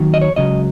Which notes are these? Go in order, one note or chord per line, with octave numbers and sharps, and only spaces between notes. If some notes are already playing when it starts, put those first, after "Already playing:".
Already playing: D#2 D#3 F#3
D#5
C#5
C#2 C#3 F#3 D#5